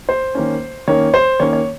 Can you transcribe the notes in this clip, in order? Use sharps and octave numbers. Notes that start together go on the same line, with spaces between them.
C5
D#3 A#3 C#4
D#3 A#3 C#4 C#5
C5
D#3 A#3 C#4 C#5
C#5